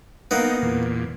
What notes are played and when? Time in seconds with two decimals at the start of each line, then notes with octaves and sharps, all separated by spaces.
0.31 A#3 B3 D#4
0.62 E2 A#2